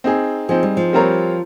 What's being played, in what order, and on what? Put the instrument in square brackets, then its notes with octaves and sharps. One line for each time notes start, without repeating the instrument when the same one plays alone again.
[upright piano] C4 D#4 G#4
[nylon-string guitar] F3 [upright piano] C4 D#4 G#4
[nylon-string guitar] G3
F3
[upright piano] G3 C4 F4 A#4 C#5